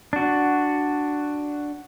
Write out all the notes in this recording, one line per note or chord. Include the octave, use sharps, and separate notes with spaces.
D4 F#4